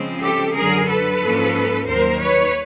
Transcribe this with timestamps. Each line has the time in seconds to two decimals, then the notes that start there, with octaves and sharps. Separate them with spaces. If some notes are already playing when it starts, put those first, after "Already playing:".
Already playing: C#3 F3 G#3 C4
0.21 G4 A4
0.54 F#2 D3 F#3 G#4 A#4
0.88 A4 B4
1.20 G#2 F3 A#3 C#4
1.87 D#2 D#3 F#3 A#4 C5
2.21 B4 C#5